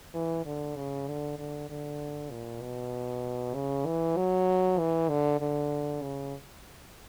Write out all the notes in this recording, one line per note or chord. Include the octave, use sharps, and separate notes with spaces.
E3
D3
C#3
D3
D3
D3
A#2
B2
C#3
E3
F#3
E3
D3
D3
C#3